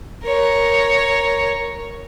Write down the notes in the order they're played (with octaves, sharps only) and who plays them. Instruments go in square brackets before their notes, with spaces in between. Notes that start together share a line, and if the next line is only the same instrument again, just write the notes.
[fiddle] A#4 C#5